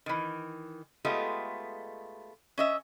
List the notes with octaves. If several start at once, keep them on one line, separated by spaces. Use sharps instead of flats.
D#3 E3
G#3 A3 B3 F4 G4 D#5
C#4 D#5 E5